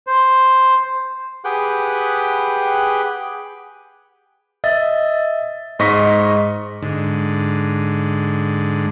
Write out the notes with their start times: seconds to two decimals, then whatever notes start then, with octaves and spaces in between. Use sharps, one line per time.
0.07 C5
1.44 G4 G#4 B4 F#5 G5
4.64 D#5 E5 A6
5.79 G#2 D#5 C#6 A#6 B6
6.83 G#2 D3